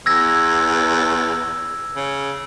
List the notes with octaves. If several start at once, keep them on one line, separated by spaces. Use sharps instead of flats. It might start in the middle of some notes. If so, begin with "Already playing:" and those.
E2 E6 G#6 A#6
C#3